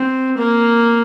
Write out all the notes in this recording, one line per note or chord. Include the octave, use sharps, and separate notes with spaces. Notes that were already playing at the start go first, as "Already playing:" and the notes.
Already playing: C4
A#3